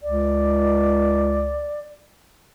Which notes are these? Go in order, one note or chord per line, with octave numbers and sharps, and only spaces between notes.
C#2 D5